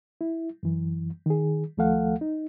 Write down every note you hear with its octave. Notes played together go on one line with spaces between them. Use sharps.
E4
F#2 E3
D#3 G#4
D#2 F3 A3 A4 F5 F#5
D#4